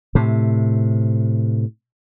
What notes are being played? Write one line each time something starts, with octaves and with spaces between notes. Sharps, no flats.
A2 C3